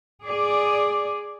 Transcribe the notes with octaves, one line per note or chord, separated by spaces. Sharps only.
G#4 D5